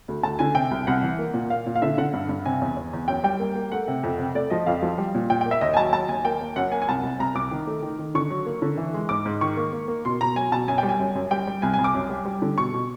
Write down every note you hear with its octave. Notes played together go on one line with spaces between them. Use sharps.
D2
D2 A5
D3 G#5
C3 G5
C2
C2 F#5
E3
A#3
A#2
A#3 F5
A#2
F5
D3 E5
D3 F#5
G2
G2
C3 G#5
E2
E2
E2
F#2 G5
G3 G5
A#3
A#3
A3 F#5
C3
F2
C3
A3 D5
F3 D#5
F2 F5
F3
G3
A#2
A#2 G5
G5
A#3
E5
D#2 D#5
G#5
F#3 A5
F#3 A5
D#2 G#5
A#3 G5
A#3
F#2 F#5
A#3 G#5
G#5
C2 A5
C2
C2 A#5
C2 D6
D#3
A3
D#3
D#3
D3 C#6
F#3
A#3
D3
E3
G#3
G#2 D6
G#2
D#3 C#6
A#3
A#3
A#3
B2 C6
B2 A#5
F#3 G#5
B2 A5
F#2 G#5
G3 G5
G#5
F#2
F#2
G3 G5
G3
C2 G#5
G#5
C2
D6
F#2
G3
G3
D3
B2 C#6
B2